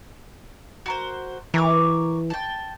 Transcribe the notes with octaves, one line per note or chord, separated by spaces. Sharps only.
F#4 A#4 C5
E3 A#4 C#5 D6
G5 A5